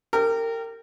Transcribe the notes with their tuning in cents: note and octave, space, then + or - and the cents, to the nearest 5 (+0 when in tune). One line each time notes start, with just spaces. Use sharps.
G4 +0 A#4 -30